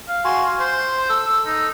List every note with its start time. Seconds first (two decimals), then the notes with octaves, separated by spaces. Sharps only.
0.09 F5
0.25 F#4 G#5 C6
0.59 C5 C6
1.10 A4 E6
1.46 D#4